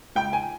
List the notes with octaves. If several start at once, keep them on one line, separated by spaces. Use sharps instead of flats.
C#2 G5
G#5